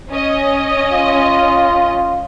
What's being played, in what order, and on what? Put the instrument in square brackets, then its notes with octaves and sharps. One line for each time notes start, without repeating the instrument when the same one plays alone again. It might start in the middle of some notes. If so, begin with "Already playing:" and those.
[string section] C#4 D#5
[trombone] F4